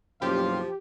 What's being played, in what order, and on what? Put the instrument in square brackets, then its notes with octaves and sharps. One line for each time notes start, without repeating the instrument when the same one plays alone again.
[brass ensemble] F#1 B1 F#2 [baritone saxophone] F3 [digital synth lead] G4 [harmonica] F5 C6